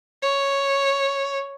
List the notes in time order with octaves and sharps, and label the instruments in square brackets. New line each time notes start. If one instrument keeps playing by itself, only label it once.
[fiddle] C#5